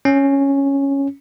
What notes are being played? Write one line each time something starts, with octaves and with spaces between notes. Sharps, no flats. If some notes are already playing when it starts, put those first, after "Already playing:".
C#4